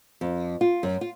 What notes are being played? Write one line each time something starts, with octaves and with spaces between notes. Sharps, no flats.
F2
F4
F#2
F4